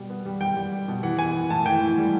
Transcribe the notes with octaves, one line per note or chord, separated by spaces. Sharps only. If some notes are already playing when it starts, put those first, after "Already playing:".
Already playing: B2 G3
B3
G3
G3 G5
G3
G3
B2
E3 F#5
B3 G#5
E3
A2 A5
E3 G5
A2
G3